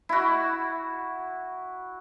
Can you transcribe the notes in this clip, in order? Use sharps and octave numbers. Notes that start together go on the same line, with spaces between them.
E4 F#4